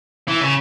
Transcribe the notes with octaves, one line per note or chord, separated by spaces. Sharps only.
E3
C#3